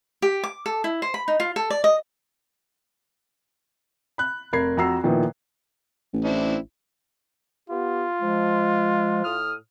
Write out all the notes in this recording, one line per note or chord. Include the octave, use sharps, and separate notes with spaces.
G4
D6
A4
E4
C5
B5
D#4
F4
A4
D5
D#5
B5 F#6
F1 A#4 B5 G#6 C7
F2 F#4 A#5 E6 C7
A#2 D#3 F3 B3 E4
A1
C4 D4 E4
B3 F4 G4
F3 G#3
A2 D#6 F6